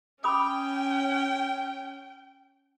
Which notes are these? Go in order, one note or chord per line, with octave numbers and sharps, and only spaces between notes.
C#4 G5 B5 D6 D#6